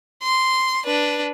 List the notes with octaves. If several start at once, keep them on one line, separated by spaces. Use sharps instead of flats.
C6
D4 B4